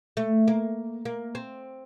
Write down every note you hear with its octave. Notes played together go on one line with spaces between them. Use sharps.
A3
A#3
A#3
C4